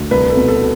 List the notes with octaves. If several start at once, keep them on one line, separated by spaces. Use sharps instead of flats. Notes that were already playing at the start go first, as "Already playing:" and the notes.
Already playing: D2
C2 B4
A4
B2
A4